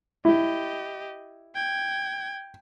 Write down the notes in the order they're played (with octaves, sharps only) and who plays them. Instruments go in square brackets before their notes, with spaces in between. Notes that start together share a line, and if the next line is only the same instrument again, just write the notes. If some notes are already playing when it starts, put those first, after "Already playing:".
[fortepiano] E4 [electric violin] G4 D#5
[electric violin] G5 G#6